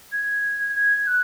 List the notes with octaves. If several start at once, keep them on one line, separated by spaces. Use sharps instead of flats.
G#6
G#6
F#6